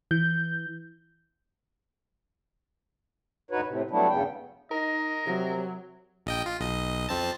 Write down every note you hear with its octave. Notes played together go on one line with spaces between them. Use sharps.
E3 G6
D2 G2 D#4 F#4 B4 C#5
A2 C3
F#3 G3 A3 B3 D4 E4
E2 G2 C#3 B3 G5
D#4 A#4 D#5
C3 F#3
A#1 D#5 G5
F4
B1 D#5
F2 C4 A5